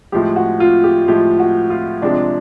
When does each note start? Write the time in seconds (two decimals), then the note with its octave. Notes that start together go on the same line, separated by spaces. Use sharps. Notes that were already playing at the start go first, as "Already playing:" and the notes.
0.12 A2 F3 G#3 G4
0.36 F#4
0.60 F4
0.84 G4
1.07 A2 F3 G#3 G4
1.39 F#4
1.70 F4
2.02 C3 F3 G#3 D4